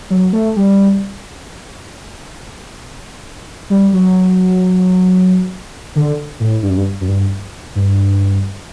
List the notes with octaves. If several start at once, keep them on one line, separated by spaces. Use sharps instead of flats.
F#3
A3
G3
G3
F#3
D3
A2
G2
F#2
G2
F#2
G2
G2